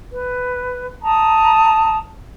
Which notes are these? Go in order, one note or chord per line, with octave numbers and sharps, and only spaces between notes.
B4
A5 A#5 D#6